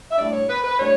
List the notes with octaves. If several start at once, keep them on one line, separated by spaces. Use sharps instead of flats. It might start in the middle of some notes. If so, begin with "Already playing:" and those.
E5
A2 G3 D4 D5
C#5
B4
B4
A2 G3 D4 C#5